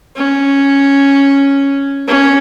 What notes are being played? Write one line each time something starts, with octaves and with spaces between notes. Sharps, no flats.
C#4
C#4